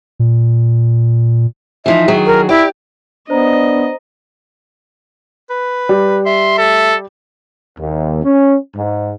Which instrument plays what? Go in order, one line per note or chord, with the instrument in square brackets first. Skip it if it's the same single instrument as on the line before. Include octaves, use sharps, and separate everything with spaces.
[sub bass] A#2
[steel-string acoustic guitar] E3 F3 D#4 [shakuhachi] E5
[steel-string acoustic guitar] D#3 F#3 G#4
[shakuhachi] A#4
[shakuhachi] E4 [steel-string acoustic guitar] G4 D5
[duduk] B3 [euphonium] D4 [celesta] C5 A#5 [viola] D#5
[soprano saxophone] B4
[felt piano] G3
[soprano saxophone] E5 [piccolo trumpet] C6
[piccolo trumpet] A4
[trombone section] D#2
C#4
G#2